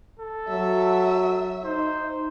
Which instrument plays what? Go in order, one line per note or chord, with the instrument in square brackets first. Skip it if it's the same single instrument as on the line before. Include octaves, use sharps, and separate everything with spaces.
[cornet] A4
[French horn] F#3 [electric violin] E5
[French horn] D#4 [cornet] C5